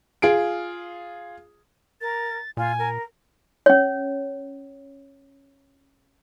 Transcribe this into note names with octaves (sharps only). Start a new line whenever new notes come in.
F4 G#4 D7
A#4 A6
A#2 F4 G#5
A#4
C#4 C#5